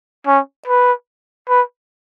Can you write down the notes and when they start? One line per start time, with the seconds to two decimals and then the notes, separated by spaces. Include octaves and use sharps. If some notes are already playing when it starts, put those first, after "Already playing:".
0.27 C#4
0.68 B4
1.49 B4